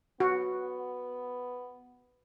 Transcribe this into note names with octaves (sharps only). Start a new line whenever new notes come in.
B3 F#4